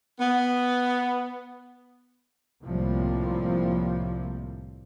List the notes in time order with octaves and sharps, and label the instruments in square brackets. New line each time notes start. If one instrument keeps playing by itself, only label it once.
[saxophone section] B3
[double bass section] C2 A2 C3 F3 G3 A#3